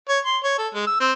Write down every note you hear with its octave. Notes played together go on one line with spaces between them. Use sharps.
C#5
C6
C#5
A4
G#3
E6
C4